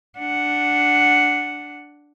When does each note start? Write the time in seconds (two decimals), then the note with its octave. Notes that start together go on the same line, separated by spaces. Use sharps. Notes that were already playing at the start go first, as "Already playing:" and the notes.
0.19 D4 F#5